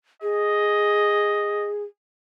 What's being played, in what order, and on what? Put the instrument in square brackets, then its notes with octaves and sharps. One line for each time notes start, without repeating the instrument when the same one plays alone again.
[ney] G#4 [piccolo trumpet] D#5